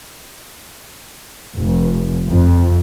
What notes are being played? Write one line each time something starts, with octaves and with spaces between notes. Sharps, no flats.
F1
F2